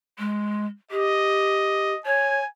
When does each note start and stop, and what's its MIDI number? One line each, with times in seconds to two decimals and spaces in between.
0.18 0.66 56
0.91 1.93 67
0.91 2.01 75
2.06 2.40 73
2.06 2.47 80